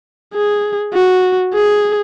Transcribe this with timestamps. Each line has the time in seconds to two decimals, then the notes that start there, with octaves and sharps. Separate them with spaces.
0.34 G#4
0.94 F#4
1.53 G#4